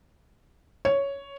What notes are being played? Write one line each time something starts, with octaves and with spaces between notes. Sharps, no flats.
C#5